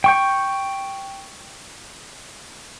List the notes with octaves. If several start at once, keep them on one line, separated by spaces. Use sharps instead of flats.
G5 C#6 G6